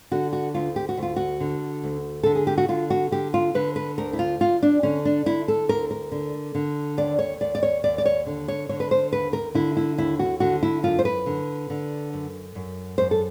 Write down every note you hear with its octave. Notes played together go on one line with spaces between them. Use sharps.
D3 F#4
F#4
D2 F4
G4
F#4
D2
F4
F#4
D3
D2
D3 A4
G#4
G4
F#4
D3 F4
F#4
D3 G4
F4
D3 B4
B4
D2 A#4
E4
F4
D2 F4
D4
D3 C#4
D4
D3 E4
A4
D2 A#4
A#4
D3
D3
D#2 D5
C#5
D#2 D5
D5
C#5
D#2 D5
D5
C#5
D3
C#5
D3 C#5
B4
C5
D#2 B4
A#4
D3 E4
E4
D#2 E4
F#4
D3 F#4
E4
F#2 F4
C5
B4
D3
D3
F#2
F#2
F#2 C5
A4